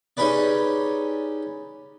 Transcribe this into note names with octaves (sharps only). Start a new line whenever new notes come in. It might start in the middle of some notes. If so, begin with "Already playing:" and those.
C#4 D#4 G4 G#4 B4 D5